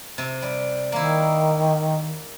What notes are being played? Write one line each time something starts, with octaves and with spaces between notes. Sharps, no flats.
C3
G3
D#3 A#3 E4